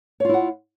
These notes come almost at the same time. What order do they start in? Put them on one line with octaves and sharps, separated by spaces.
C#5 F4 E4 F#5